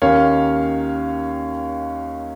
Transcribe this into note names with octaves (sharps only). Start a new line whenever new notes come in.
D#2 D#3 A#3 C#4 C#5 F5